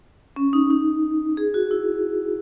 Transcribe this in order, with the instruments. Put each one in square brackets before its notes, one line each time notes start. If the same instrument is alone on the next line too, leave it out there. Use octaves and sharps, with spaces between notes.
[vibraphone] C#4
D#4
D#4
G#4
F#4
E4